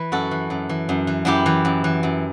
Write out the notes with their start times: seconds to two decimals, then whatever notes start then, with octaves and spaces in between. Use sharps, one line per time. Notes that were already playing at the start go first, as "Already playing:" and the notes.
Already playing: E3 B4
0.12 F#2 F#4 A4
0.31 E3
0.50 F#2
0.69 E3
0.89 F#2
1.07 E3
1.25 F#2 E4 G4
1.46 E3
1.65 F#2
1.84 E3
2.03 F#2